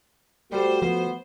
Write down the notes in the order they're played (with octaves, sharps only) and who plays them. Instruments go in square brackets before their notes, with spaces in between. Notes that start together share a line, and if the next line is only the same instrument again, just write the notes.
[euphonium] G3 [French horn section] A3 F#4 [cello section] C5
[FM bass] F3 [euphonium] B3